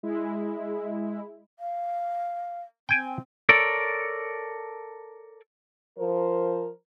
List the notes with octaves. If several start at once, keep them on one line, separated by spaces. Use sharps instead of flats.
G#3 E4
F5
C4 G5 G#5
A4 A#4 C#5 D5
F3 A#4 C5